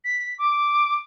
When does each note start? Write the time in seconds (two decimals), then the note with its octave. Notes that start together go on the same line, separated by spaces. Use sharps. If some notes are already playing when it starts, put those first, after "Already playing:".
0.04 B6
0.38 D6